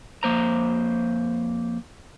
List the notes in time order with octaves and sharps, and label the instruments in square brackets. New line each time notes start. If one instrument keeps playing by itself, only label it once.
[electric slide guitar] F2 A#3 C5 A#5